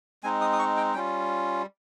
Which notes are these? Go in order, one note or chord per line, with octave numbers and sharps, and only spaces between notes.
G#3 C4 D#4 G#5
D#6
D#6
C#6
G5
G3 C#4 F4 G5